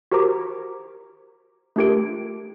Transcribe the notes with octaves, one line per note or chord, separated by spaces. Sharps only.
F#4 G4 A#4 C5 A#5 D6
A3 D4 F4 G4 A#4 D7